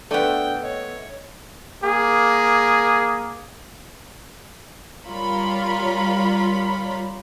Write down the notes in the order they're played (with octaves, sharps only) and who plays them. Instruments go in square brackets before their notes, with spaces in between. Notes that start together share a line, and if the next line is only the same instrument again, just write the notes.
[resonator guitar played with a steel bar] A3 B3 [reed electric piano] D4 A4 D5 [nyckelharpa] G5
[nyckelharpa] C#5 [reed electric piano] D#5
[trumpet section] A#3 G#4
[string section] G3 F4 A#4 C#5 B5